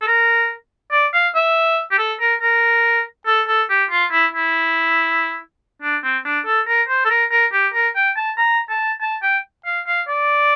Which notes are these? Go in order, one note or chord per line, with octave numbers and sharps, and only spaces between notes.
A4
A#4
D5
F5
E5
G4
A4
A#4
A#4
A4
A4
G4
F4
E4
E4
D4
C4
D4
A4
A#4
C5
A4
A#4
A#4
G4
A#4
G5
A5
A#5
A5
A5
G5
F5
F5
D5